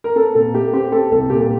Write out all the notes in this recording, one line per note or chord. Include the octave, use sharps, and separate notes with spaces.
A#4
C4 A4
A#2 A4
A3 G4
C4 G4
C4 A4
C2 A4
A#2 G4
G4